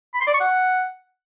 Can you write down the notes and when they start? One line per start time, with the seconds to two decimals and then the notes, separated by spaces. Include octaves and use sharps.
0.14 B5
0.21 C6
0.27 D5
0.34 C#6
0.40 F#5